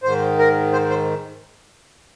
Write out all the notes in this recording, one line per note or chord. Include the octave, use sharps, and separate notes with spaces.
G#2 D#3 C5
A#4
C5
C5